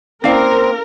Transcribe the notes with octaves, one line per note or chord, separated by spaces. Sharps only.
A#3 C4 C#4 E4 A#4 D5 F5